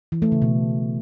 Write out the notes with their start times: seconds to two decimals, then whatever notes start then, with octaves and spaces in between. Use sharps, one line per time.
0.12 E3
0.22 A3
0.32 C#3
0.42 B2